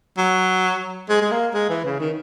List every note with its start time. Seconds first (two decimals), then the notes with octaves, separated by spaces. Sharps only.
0.18 F#3
1.09 G#3
1.22 G#3
1.31 A#3
1.54 G#3
1.70 E3
1.85 C#3
2.00 D#3